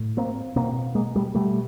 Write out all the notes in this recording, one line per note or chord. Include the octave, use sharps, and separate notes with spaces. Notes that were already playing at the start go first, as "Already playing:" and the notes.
Already playing: A2
A#3 C4
B2 A#3 C4
G#3 A#3
G3 A3
B2 G3 A3